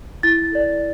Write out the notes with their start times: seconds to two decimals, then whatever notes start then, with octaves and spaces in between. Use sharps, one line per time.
0.23 E4 A6
0.52 A4 D5